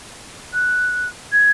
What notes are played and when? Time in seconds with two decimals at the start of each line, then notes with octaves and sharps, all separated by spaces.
0.53 F#6
1.32 G#6